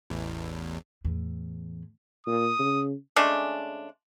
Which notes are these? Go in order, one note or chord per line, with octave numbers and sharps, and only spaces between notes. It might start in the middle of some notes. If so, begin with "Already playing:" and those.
A1 E2
E2 A2
A#2 D#6
C#3
C#3 G#3 A3 D4